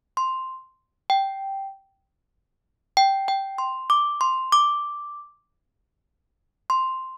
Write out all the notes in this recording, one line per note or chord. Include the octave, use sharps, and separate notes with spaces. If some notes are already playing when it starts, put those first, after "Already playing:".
C6
G5
G5
G5
C6
D6
C6
D6
C6